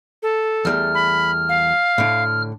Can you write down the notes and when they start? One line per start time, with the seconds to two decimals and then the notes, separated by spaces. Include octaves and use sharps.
0.23 A4
0.65 E2 G3 A3 F6
0.95 B5
1.49 F5
1.98 A2 D3